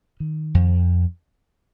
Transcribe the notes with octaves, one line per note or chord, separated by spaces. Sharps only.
D#3
F2